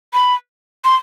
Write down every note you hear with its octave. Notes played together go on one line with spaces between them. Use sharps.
B5
C6